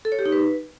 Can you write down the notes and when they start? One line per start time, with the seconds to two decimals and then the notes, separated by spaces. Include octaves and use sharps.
0.05 A4
0.12 C#5
0.19 G4
0.26 D#4
0.32 B4